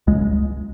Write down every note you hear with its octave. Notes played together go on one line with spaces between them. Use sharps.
C#2 G#3